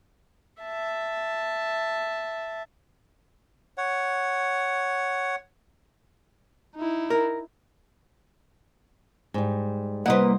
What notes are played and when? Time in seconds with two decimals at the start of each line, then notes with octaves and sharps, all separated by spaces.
0.63 E5 A5
3.78 C#5 F#5
6.76 D#4 E4
7.10 A#4
9.34 G#2 G3
10.06 C2 A#3 B4 C5 D#5 F#5